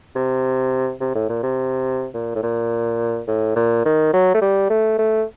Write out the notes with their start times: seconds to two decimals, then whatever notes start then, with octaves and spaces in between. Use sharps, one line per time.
0.16 C3
1.00 C3
1.15 A2
1.29 A#2
1.43 C3
2.14 A#2
2.35 A2
2.43 A#2
3.27 A2
3.56 A#2
3.85 D#3
4.13 F#3
4.34 A3
4.42 G3
4.70 A3
4.99 A3